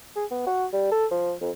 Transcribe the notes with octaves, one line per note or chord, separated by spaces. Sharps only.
G#4
B3
F#4
G3
A4
F3
F2